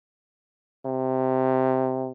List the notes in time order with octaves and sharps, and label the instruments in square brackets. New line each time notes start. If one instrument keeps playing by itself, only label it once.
[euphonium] C3